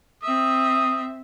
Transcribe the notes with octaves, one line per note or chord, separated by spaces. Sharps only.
C4 E5 D#6